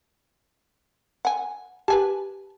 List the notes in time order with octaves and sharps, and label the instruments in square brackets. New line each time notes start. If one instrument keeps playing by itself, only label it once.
[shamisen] F#5 G#5
[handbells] G4 [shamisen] B4 G#5 A5